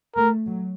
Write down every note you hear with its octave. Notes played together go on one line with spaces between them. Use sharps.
A3 A#4
F#3